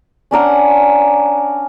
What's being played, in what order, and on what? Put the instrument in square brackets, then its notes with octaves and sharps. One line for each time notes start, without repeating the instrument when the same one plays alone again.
[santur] C#4 D4 A#4 F#5